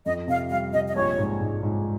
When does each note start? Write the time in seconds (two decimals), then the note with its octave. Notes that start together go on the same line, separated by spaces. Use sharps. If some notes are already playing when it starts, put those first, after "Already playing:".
0.05 F2 D#5
0.28 C3 F5
0.50 G3 F5
0.73 C3 D#5
0.88 D#5
0.95 A#1 C#5
1.18 G#2
1.41 G#2
1.63 G#2